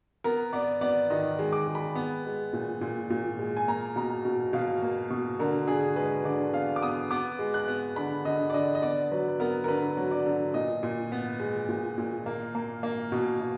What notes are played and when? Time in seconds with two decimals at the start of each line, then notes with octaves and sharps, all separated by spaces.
0.24 B3 A#4
0.53 B3 D5
0.81 B3 D5
1.10 D#3 D#5
1.39 G#3
1.53 D6
1.67 G#3
1.75 B5
1.95 B3
2.25 G#3
2.53 A#2
2.81 A#2
3.10 A#2
3.39 G#3
3.57 G#5
3.68 A#3 A#5
3.96 B2 A#5
4.25 B2
4.53 B2 F5
4.82 A#3
5.10 B2
5.39 D3 A#4
5.67 D3 G#4
5.96 G#3 B4
6.25 D3 D5
6.53 B3 F5
6.76 D6
6.83 B3 D#6
7.11 B3 D6
7.39 G#3
7.54 F#6
7.68 B3
7.96 D3 B5
8.25 D3 D#5
8.50 D5
8.54 D3 D#5
8.75 D#5
8.82 B3 D5
9.11 F#3 B4
9.28 B4
9.40 B3 A#4
9.64 A#4
9.68 D3 B4
9.97 F#3
10.11 D5
10.26 D3
10.54 A#2 D#5
10.83 A#2
11.12 B3
11.40 G#3
11.69 A#2
11.98 A#2
12.26 A#3
12.55 A#3
12.83 A#3
13.12 B2
13.40 B2